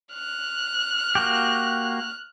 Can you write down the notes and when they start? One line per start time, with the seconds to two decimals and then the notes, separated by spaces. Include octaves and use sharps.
0.13 F6 F#6
1.15 A#3 F#4 G4